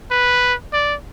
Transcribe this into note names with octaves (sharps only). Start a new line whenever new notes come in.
B4
D5